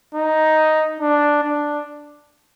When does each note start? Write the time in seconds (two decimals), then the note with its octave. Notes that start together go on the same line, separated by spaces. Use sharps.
0.15 D#4
1.00 D4
1.43 D4